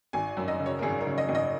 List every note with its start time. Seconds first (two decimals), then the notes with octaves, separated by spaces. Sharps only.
0.13 G#1 G#5
0.37 F#2
0.48 D#5
0.60 C#3
0.66 C#5
0.79 A#4
0.82 G#1 G#4
1.01 A#4
1.07 C#3
1.18 D#5
1.29 G#1
1.35 D#5